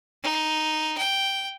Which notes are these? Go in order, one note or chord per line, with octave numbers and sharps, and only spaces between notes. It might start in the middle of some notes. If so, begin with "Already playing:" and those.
D#4
G5